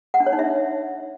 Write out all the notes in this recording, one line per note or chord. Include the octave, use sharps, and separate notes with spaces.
F#5
D4
C#5
D#4
E5